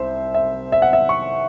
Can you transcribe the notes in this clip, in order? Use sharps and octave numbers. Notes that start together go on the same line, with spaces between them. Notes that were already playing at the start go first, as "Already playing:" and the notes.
Already playing: C2 C5 E5
E5
E5
F#5
E5
C#6